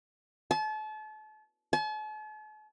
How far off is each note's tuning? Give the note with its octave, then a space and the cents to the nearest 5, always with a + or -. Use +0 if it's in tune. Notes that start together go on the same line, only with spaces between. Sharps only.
A5 -35
A5 -45